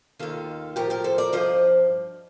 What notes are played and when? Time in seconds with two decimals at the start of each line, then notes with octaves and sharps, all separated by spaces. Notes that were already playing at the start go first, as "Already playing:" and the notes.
0.19 D#2 D#3 F4 A4
0.76 A2 F3 G4 A#4
0.90 G4 A#4
1.04 A4 C5
1.18 A#4 D5
1.32 G2 F3 C5 D#5